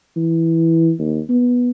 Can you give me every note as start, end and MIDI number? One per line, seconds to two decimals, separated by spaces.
0.16 0.92 52
0.99 1.20 39
1.29 1.70 59